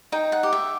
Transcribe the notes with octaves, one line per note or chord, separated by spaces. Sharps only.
D#4 G5
F#5
G4
E5